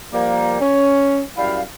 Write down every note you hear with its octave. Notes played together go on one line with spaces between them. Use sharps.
F3 G3 A#3
C#4
F#2 G3 E4 F5